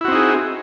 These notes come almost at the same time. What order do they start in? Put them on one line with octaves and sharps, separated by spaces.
E4 F#4 C4 D#4 G#4